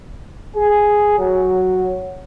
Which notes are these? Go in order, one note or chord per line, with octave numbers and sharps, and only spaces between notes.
G#4
F#3